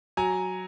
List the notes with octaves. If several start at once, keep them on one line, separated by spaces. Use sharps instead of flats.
F#3 G#5 A#5